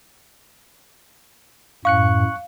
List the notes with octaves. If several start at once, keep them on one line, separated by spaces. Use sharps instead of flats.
F#2 A2 F5 C#6 F#6 C#7